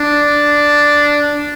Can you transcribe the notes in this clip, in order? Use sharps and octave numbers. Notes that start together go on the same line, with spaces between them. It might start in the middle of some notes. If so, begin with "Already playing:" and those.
Already playing: D4